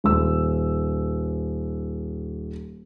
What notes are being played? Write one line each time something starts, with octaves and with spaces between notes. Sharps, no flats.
D#1 E6